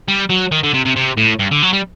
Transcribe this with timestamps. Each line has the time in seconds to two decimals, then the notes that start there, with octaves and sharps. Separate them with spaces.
0.08 G3
0.30 F#3
0.52 D#3
0.63 D3
0.74 C3
0.85 C3
0.96 C3
1.17 A2
1.39 G2
1.51 D3
1.63 F#3
1.73 G3